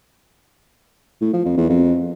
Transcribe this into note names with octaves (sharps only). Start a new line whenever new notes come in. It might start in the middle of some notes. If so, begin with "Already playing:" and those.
A2
F3
F2
E2
F2